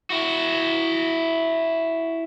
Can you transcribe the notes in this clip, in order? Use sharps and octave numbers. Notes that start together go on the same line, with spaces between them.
E4 F#4